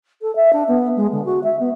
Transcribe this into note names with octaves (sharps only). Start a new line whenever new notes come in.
A4
E5
D4
B3
G#3
D3
F#4
E5
B3